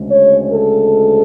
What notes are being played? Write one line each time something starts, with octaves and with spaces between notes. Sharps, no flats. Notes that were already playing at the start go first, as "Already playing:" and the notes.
Already playing: D2 C#3 G#3
C#5
A4